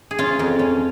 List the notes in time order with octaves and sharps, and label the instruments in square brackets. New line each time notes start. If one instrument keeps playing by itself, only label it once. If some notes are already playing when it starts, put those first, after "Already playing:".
[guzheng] G#4
C#4 F4
F2
C#4